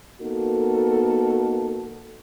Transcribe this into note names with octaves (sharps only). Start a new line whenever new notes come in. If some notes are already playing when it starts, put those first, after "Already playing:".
A#3 B3 D#4 F#4 A4 A#4